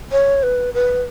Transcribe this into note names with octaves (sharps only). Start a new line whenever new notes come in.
C#5
B4
B4